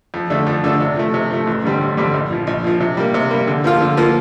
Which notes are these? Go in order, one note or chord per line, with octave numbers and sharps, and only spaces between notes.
F2
D3 A3 D4 A4
F2
D3 A3 D4 A4
C3
F3 A3
C3
F3 A3
A1
G2 D3 G3 C4
A1
G2 D3 G3 C4
A#1
A#2 F3
A#1
A#2 F3
C3
G3 A#3
C3
G3 A#3
D3
F3 A#3 F4
D3
F3 A#3 F4